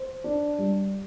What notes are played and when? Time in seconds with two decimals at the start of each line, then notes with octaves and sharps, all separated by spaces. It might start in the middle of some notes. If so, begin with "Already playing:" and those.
Already playing: C5
0.24 D4
0.58 G3